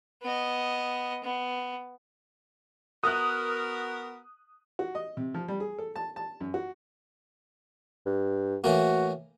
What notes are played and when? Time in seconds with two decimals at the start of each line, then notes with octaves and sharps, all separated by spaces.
0.23 B3 D#5
1.24 B3
3.04 B3 F#4 A#4 D#6 F#6
4.79 F#4
4.95 D#5
5.17 C3
5.34 F3
5.48 G3
5.60 G#4
5.78 A4
5.96 A5
6.16 A5
6.41 F#2
6.54 F#4
8.06 G2
8.64 A2 E3 A#3 F#4